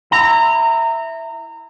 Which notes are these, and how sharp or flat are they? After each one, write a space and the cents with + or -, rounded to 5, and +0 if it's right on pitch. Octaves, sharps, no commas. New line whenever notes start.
E4 +0 A#5 -20